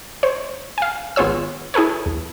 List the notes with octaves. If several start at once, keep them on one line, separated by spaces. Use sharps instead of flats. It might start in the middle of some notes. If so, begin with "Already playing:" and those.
C5 C#5
F5 G#5
G#1 B3 F4 G#4 C#5 E6
E4 G#4 A4 B4 C#5
E2